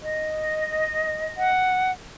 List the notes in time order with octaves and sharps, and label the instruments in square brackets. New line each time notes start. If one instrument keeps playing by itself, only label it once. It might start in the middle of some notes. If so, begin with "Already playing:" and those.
[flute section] D#5
[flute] F#5